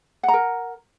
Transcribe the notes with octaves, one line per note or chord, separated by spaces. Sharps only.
A#4 F#5 A#5